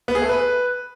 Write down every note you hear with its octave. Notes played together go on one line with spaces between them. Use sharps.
B3
G#4
A3
B4